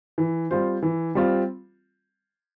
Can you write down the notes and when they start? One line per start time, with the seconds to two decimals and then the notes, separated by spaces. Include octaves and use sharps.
0.18 E3
0.51 G3 C4 F4 C5
0.83 E3
1.15 G3 C4 F4